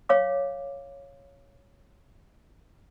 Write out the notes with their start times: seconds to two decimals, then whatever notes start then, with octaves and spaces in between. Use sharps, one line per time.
0.09 C#5 F5 D6